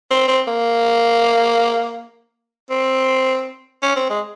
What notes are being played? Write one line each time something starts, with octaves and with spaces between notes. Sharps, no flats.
C4
C4
A#3
C4
C#4
C4
G#3